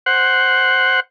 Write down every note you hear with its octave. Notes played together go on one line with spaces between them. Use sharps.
C5 F#5